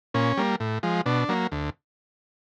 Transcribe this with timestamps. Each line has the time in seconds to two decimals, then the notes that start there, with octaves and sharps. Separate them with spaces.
0.14 A#2 C#4
0.37 G3 A#3
0.60 A2
0.83 F3 G#3
1.06 B2 D4
1.29 F#3 A#3
1.52 D2